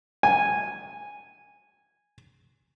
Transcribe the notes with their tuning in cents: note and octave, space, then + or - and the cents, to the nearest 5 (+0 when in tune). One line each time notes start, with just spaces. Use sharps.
G#5 -10